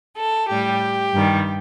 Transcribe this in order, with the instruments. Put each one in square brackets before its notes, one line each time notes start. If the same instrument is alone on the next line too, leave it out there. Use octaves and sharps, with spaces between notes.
[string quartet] A4
A2 G3 G4
G2 D#3 G3